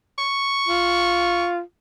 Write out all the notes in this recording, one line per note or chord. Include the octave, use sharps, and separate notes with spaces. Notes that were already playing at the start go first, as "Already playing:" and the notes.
C#6
F4